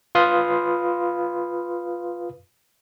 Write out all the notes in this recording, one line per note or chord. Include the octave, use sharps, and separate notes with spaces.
F4 B4 F5 B5 C6 D#6